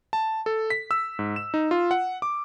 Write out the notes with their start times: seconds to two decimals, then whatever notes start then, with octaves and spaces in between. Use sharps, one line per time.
0.13 A5
0.46 A4
0.70 B6
0.91 E6
1.19 G#2
1.36 E7
1.54 D#4
1.71 F4
1.91 F#5
2.22 D6